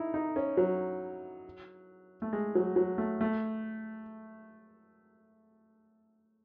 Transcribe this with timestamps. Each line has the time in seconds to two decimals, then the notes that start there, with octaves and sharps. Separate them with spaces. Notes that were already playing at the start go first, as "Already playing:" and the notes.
Already playing: D#4 E4
0.14 D#4
0.36 C#4
0.57 F#3
2.22 A3
2.33 G#3
2.55 F#3
2.76 F#3
2.98 A3
3.21 A3